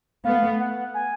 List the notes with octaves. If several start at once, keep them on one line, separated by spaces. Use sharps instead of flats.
A3 B3 F5
F#5
G#5